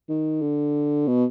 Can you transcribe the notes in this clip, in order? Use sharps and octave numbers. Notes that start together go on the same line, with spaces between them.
D#3
D3
B2